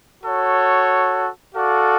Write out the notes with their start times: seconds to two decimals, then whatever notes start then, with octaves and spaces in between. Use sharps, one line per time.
0.23 F#4 A4 C#5
1.55 F#4 A4 D5 F5